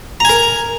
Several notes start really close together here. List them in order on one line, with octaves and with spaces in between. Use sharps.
A#5 G#5 A#4